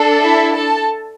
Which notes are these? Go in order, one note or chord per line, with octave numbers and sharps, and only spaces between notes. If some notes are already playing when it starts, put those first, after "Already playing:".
Already playing: D4 A4
E4 E5
A4 A5